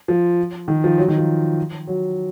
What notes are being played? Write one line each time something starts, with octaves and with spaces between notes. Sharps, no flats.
F3
D#3
F3
F#3
D#3
F3
F#3